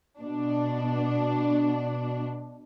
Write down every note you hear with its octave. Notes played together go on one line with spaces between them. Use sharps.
B2 D4